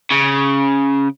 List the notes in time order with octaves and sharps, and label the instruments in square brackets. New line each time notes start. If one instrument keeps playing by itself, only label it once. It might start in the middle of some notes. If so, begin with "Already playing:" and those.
[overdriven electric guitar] C#3